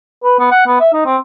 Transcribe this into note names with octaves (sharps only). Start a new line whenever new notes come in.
B4
B3
F#5
B3
E5
D#4
C4